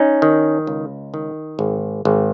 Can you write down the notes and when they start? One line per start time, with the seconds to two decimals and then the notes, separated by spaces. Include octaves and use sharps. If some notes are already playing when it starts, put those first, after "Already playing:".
Already playing: C#4 D#4
0.22 D#3
0.67 C#2
1.14 D#3
1.59 G#1
2.05 G#1